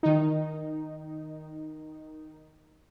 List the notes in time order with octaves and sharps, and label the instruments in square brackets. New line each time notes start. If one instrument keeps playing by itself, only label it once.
[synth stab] D#3 D#4